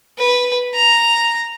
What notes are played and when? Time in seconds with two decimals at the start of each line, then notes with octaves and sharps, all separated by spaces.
0.19 B4
0.75 A#5